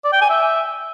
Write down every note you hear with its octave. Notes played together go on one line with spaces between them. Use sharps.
D5
G5
G#5
E5